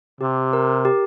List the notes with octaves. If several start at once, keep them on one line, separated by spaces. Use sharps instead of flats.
C3 G4
A#4
G4